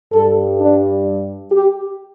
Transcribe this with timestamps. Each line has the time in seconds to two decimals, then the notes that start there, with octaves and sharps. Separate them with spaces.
0.12 G2 G3 A4
0.59 D4
1.52 G4